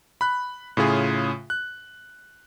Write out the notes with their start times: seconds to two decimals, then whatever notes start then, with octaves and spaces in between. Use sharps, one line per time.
0.21 B5 F#6
0.77 A2 C#3 F4 G#4
1.50 F#6